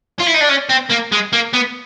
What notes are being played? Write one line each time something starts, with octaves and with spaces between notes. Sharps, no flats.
F4
E4
D#4
D4
C#4
C4
A#3
G#3
A#3
B3